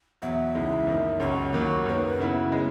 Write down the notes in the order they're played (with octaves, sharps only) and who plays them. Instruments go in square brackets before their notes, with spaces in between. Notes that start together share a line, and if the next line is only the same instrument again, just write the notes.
[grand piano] E2 B2 F#3 [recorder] E5
[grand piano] C#2 C#3 E3 G#3 D#4
F#2 D#3 A#3 D#4
[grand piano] C#2 C#3 F#3 [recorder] C#5
[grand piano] D#2 D#3 F#3 A#3
[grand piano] F#2 [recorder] C#5
[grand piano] D#3 A#3 [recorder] B4
[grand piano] C#3 F#3 B3 E4
C#3 G#3 B3